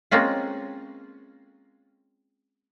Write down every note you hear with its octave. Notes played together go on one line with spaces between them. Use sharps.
G#3 A#3 C4 C#4 F4